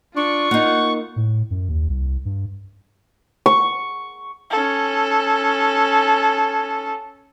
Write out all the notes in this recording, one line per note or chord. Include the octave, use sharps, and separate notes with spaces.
D4 F4 C#6 C#7
A#3 D#4 F#5
A2
F#2
D#2
C2
G2
C#6
C#4 A4